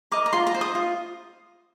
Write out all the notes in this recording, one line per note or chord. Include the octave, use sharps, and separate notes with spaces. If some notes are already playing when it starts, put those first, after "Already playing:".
A#4 D#5 D6
A#5
F4 C6
A#5
C5 D#5
D#6
F4